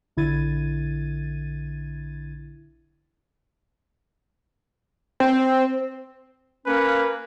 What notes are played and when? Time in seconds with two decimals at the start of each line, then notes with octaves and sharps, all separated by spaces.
0.17 A#1 D3 E4 G#6 A6 D#7
5.20 C4
6.66 A#3 C#4 B4